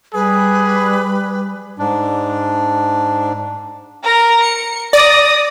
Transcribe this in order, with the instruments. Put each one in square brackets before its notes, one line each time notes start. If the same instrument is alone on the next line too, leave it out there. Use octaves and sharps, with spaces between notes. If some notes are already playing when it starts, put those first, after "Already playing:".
[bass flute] G3 [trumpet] G#4 [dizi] B4
[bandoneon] G#2 D4
[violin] A#4 A#5
C#7
[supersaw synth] D5 [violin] D#6 A#6